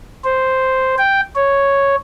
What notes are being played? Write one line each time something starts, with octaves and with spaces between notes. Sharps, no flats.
C5
G5
C#5